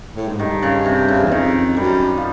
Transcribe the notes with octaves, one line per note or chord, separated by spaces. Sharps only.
A2
G#2
G2 D#3
C#3
C3
C#3
E2
F2 D#3
F#2 G3
F3